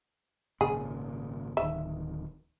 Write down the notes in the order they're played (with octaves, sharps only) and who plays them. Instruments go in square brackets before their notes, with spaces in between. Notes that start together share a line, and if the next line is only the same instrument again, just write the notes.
[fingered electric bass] G#1 A#2 C#3 [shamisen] G#4
[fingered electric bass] D1 D#3 [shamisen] E5